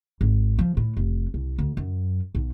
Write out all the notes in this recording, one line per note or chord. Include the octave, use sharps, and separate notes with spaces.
G#1
F3
A2
F1
C2
D2
F#2
B1